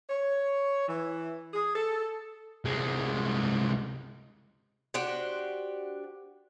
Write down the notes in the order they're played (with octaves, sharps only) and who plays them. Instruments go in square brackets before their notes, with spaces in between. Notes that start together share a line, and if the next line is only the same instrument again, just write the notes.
[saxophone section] C#5
E3
G#4
A4
[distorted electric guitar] C2 G#3
[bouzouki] D4 F#4 G4 C5